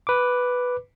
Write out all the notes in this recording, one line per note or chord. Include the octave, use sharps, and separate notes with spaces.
B4 D6